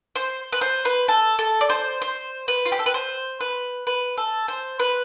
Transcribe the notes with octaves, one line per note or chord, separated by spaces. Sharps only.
C5
B4
C5
B4
A4
A4
D5
C5
C5
B4
F4
G4
A4
B4
C5
B4
B4
A4
C5
B4